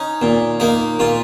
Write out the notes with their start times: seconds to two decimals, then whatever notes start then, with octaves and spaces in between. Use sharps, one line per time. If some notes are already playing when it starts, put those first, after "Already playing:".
Already playing: C#4 D#4
0.22 A#2
0.60 A#3 D#4
0.99 A#2 F4